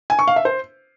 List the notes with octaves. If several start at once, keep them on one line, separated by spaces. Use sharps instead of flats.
G#5
C#6
F5
E5
C5